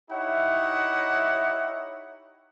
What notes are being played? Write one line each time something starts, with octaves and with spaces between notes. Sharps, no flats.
D#4 E4 G4 C#5 E5 F#5